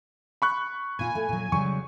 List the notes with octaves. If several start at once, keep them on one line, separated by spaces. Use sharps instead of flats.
B5 C#6 F#6
A#2 F4 G#5
A3
A#2 F#3
C#3 F#3 G3 C#6